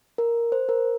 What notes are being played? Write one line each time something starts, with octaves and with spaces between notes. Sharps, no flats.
A#4
C5
A#4